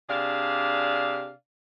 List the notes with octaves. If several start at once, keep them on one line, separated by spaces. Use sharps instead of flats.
C3 D4 G#4 D5 F5